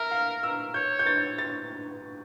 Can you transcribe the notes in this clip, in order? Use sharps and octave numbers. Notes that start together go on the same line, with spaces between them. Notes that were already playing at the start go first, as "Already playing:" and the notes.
Already playing: A#4 E5
F5
E6
C#5 G6
G6
A6
A6